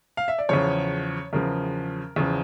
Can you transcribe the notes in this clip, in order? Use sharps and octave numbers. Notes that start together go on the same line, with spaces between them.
F5
E5
D5
E2 C#3 F3 C#5
E2 C#3 F3 A#4
E2 C#3 F3